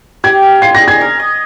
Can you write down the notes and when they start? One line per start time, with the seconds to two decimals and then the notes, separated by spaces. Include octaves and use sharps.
0.24 G4 G#6
0.42 A#4
0.62 F4 C7
0.75 A#6
0.82 G#4
0.88 G#6
1.01 A#4
1.19 D#5